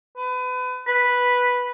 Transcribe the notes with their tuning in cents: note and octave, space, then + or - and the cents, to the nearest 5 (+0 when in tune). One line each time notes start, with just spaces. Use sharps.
B4 +30
B4 -5